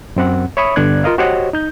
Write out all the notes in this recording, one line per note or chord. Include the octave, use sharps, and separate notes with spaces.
F#2 C4 F#5
C#5 E5 B5 C#6 D#6
G2 D3 B3 D5 F#6 G#6
F4 A#4 D#5 F5
F#4 G4 C5 C#5 D#5 F#5
D#4 G6